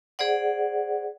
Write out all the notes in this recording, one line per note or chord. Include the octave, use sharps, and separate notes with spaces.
G#4 C5 D5 F#5